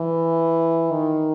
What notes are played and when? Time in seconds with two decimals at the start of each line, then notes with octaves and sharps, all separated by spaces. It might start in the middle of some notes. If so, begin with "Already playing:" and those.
Already playing: E3
0.91 D#3